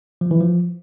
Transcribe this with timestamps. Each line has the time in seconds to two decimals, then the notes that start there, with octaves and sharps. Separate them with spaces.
0.21 F3
0.31 E3
0.41 F3